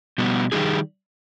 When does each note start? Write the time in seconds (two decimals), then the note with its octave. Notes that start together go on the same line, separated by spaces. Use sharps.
0.18 B2 G3 B3
0.52 D#3 G3 A#3 D#4 G#4